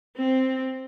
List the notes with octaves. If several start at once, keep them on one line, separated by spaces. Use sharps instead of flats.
C4